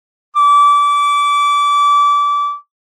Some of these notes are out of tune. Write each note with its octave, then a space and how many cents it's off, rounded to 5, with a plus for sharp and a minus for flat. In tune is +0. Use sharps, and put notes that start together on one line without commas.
D6 -25